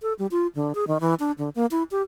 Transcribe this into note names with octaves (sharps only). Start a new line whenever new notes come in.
A4
G3
F4
D3
G#4
D#3
E3
D4
D3
A#3
E4
G4